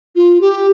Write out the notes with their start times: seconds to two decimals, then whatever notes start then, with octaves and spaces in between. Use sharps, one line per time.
0.16 F4
0.41 G4